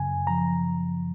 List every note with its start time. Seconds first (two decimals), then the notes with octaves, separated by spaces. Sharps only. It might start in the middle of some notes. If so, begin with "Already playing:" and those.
Already playing: F#2 C#3 G#5
0.27 F3 A#5